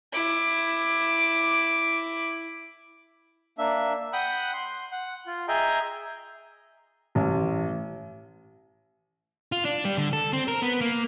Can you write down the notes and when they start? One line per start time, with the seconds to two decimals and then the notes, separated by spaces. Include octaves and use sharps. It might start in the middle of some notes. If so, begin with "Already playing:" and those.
0.13 E4 D6
3.58 A#3 D4 E5
4.13 F#5 G5 B5 D#6 F#6
4.53 C6
4.92 F#5
5.26 F4
5.48 G#4 D#5 E5 G5 A#5
7.15 A1
9.52 F4
9.65 D4
9.85 G3
9.97 D3
10.13 A4
10.33 C4
10.48 A#4
10.62 B3
10.81 A#3